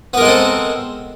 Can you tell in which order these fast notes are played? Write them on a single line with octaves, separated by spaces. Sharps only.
B3 A#4 G#3 A4 C4